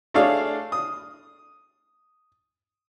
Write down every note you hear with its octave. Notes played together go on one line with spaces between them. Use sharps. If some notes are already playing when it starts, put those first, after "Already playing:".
A3 D4 G#4 C#5 D5 F5
D#6